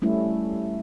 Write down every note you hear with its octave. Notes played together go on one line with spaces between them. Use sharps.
G3 A3 C#4 E4